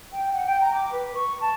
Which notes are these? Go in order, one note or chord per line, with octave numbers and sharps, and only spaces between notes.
G5
F#5
G5
A#5
D6
B4
C#6
A5